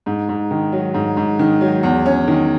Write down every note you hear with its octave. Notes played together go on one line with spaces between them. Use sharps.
G#2
G#2
D#3
F#3
G#2
G#2
D#3
F#3
E2
C#4
D#3